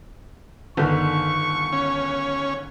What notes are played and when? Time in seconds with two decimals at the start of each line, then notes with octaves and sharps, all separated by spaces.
0.77 G1 D3 D#3 C#6
1.73 C#4